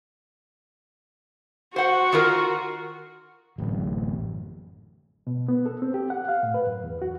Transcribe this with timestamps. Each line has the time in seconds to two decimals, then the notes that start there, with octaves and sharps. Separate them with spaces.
1.76 F#4 C5 F#5
2.12 D#3 F4 A#4
3.58 A1 F#2
5.27 B2
5.48 B3
5.66 A4
5.82 C4
5.94 G4
6.10 F#5
6.28 F5
6.43 A2
6.54 B4
6.67 F#2
6.84 E2
7.02 F#4